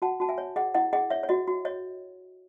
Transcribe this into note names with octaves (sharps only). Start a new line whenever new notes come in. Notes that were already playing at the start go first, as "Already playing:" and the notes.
F#4 F#5 A5
F#4 A5
E5 G#5
C#5
G#4 D#5 F#5
E4 D#5 F#5
G#4 D#5 F#5
C#5 E5
C#5
F#4 D#5
F#4
C#5 D#5